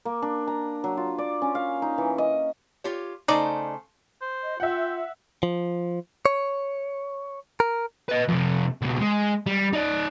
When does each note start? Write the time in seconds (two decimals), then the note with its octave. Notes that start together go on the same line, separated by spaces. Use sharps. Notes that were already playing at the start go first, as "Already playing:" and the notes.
0.05 A#3
0.22 D4
0.47 A#5
0.84 F#3
0.97 F4
1.18 D5
1.42 C#4
1.55 F5
1.82 D#4
1.98 E3
2.18 D#5
2.84 F4 G4 C#5
3.28 C#3 A3 D#4 C5 D5
4.21 C5
4.43 D#5
4.60 F4 E5 F#5 G5
5.43 F3
6.26 C#5
7.60 A#4
8.09 B4 D#5
8.29 F2 C3
8.81 C#2 B2
9.00 G#3
9.46 G3
9.73 D#4 D5